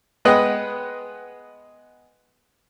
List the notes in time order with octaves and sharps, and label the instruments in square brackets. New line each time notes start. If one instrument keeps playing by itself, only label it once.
[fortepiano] G#3 B3 B4 D#5 F#5 G5